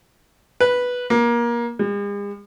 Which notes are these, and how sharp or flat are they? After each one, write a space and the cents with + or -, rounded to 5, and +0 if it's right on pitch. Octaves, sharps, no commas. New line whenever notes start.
B4 -5
A#3 +25
G#3 -45